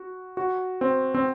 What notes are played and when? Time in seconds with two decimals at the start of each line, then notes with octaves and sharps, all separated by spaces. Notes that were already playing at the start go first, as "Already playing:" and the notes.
Already playing: F#4
0.37 F#4
0.81 C4
1.15 C4